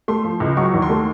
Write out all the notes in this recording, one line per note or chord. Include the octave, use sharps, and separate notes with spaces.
A3 C6
F3
C#2
F#3 C#6
D#2
C6
A3